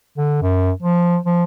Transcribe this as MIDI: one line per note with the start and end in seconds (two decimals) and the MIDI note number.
0.18 0.41 50
0.42 0.71 42
0.82 1.17 53
1.26 1.44 53